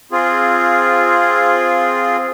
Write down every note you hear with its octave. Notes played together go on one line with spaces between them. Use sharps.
C4 F4 G#4